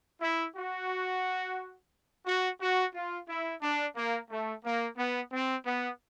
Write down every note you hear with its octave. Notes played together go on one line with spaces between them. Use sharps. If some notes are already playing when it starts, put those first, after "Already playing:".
E4
F#4
F#4
F#4
F4
E4
D4
A#3
A3
A#3
B3
C4
B3